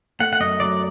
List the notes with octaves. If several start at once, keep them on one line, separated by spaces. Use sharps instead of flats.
A3 F#5
F#5
F#2 D#5
F#3 D5